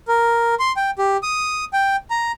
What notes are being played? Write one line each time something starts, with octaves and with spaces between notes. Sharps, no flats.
A#4
C6
G5
G4
D#6
G5
A#5